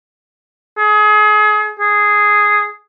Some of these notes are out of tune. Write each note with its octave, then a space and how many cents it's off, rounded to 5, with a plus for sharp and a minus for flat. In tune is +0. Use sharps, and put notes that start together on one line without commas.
G#4 +30
G#4 +0